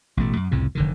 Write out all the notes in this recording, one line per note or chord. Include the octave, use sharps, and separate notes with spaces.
A1 B2 A3
F#2
C2 F2 A2 C#3
F1 D3 D#3